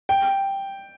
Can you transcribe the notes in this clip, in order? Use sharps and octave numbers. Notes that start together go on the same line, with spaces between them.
G5